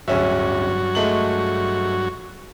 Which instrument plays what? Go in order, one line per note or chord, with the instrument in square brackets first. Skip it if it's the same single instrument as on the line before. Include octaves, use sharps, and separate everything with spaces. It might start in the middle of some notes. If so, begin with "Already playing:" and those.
[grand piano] D1 C#4 E5 [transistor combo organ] G2 F#3 F#4
[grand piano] G#3 A3 F#7